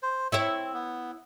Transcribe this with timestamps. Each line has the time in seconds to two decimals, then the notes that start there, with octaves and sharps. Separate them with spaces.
0.03 C5
0.32 C4 E4 C#5 E5
0.74 B3